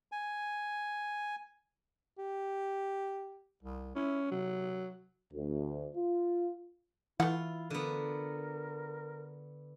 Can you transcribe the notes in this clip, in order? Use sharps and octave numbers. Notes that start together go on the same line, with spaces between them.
G#5
G4
C2
C#4 E4
C3 F#3
D2
F4
E3 A3 E4 F4 F#5
D3 B3 A#4